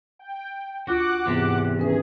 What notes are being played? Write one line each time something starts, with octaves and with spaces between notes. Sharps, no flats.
G5
D2 F4 F#4 F#5 D6 F#6
E2 G#2 C3
D#3 C#4 G#4 B4 E5